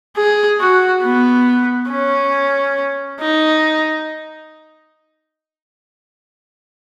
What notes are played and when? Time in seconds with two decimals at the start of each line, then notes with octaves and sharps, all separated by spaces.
0.16 G#4
0.60 F#4
1.04 B3
1.90 C#4
3.21 D#4